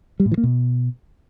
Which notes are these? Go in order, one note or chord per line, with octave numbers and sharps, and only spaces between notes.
G3
A2
E3
A#3
B2